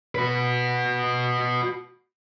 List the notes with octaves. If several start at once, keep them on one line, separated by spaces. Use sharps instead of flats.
F#4 B4